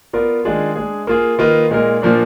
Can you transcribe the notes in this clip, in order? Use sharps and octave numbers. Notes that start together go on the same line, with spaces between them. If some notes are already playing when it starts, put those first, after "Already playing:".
B3 F4 A#4 D5
D#3 G#3 D4 F4 G#4
G#3 D4 G#4
A#3 F4 G#4
D#3 A#3 F4 B4 D#5
A#2 G#3 D#4 A#4
A#2 F3 A#3 D4